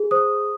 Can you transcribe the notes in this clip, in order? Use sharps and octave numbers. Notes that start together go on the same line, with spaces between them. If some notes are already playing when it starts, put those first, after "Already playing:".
Already playing: G#4
C5 D#6